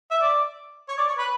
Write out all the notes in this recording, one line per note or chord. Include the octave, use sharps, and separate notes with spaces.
E5
D5
C#5
D5
C#5
B4